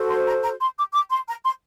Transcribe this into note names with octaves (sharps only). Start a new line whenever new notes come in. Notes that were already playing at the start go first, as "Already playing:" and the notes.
Already playing: F#4 A4 C5
C6
A#5
A#5
C6
D6
D6
C6
A#5
C6